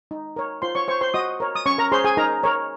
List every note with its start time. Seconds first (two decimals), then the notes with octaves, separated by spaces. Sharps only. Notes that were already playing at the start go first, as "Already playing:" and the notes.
0.11 D#4
0.36 A#4 C#5
0.62 F4 C5 C6
0.75 C#5 C#6
0.88 C5 C#5 C#6
1.01 C5 C6
1.14 F#4 D#5 D#6
1.40 A#4 C#5
1.55 D#6
1.66 C#4 C#5 C#6
1.78 A#4 A#5
1.91 G#4 C5 C#5 C6
2.04 G#4 G#5
2.17 D#4 A#4 A#5
2.43 A#4 C#5